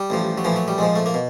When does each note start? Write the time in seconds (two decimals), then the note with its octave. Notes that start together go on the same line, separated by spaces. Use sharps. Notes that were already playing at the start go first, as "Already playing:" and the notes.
Already playing: G3
0.10 A1 A2 F3
0.38 F#3
0.44 A#1 A2 E3 F3
0.56 F#3
0.68 G3
0.78 A#1 G#2 F3 G#3
0.96 A3
1.06 A#3
1.14 B2